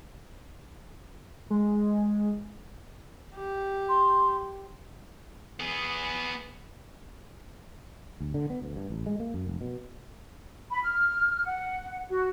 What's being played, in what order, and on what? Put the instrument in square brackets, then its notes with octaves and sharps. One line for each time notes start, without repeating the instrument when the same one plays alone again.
[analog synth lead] G#3
[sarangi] G4
[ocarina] C6
[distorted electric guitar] B3 G#4
[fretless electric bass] D2
D3
B3
D2
G2
A1
G#3
A#3
F#2
F1
B2
[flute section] B5
F6
F#5
F#4